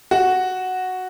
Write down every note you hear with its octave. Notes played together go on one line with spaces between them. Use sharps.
F#4